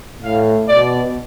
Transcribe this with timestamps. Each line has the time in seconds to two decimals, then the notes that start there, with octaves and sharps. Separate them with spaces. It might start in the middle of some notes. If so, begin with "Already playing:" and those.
0.23 A2 F5
0.68 B2 D5